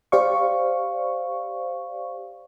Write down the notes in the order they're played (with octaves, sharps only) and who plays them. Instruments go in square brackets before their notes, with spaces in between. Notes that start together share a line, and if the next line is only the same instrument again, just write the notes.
[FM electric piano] G4 C5 D5 F5 C#6